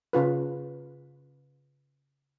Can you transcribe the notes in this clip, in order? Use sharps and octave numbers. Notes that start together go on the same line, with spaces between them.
C#3 F4 B4